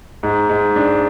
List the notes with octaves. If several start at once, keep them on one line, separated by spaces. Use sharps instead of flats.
G#2
G#2
D4